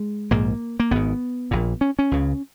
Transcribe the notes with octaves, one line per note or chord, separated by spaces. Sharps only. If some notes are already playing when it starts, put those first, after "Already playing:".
Already playing: G#3
A#1 G#2 A#3
A#3
G#1 G#2 B3
A#1 A#2
C#4
C#4
C#2 C#3